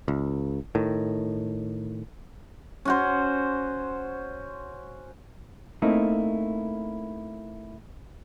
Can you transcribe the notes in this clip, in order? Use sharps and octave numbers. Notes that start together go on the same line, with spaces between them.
C#2
A2 D#3
C#4 F#4 C5
A3 A#3 C4 D#4 E4